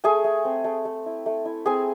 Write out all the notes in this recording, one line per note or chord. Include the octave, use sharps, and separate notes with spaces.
A3 G#4 G#5
A3
C4
A3
A3
E4
A3
E4
C4 G#4 G#5